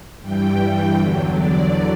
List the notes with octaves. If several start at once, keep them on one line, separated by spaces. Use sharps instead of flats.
G2 E3 G3 G5
G5
E2 D3 F#3
D5